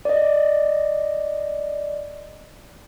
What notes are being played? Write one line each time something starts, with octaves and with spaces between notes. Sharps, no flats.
D5 D#5